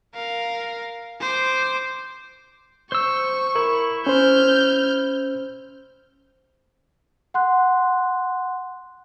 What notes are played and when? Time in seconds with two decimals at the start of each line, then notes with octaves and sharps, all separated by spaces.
0.14 A#4 F5
1.21 C5 D6
2.92 C5 C#6 E6
3.56 E4 A#4
4.07 C#4 C5 F6 G6
7.34 F#5 C6 F#6